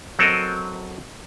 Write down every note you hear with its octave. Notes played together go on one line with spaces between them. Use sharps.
F#3 C4 A4 A#4 D#5